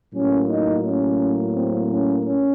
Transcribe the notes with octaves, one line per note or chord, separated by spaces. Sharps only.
A2 F#3 A#3 C#4
D#4
C#4
C4
C#4
C#4